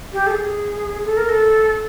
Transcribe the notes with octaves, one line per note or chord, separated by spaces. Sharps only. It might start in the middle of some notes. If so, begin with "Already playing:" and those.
G4
A4
G#4
A4
A#4
A4